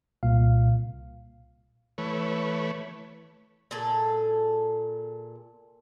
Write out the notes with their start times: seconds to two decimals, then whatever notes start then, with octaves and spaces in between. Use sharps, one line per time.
0.23 C2 A#2 F5
1.98 E3 A3 B4 C#5
3.71 A#2 G#4 A4